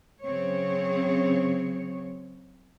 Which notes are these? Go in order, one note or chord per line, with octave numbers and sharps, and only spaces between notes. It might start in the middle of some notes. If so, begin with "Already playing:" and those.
C#3 F#3 C4 C#5